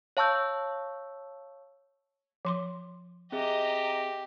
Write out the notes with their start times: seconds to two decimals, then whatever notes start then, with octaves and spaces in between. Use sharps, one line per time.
0.17 C#5 F5 A5 C#6 E6 G6
2.45 F3 C6 D6
3.32 C4 G4 G#4 D#5 E5 A#5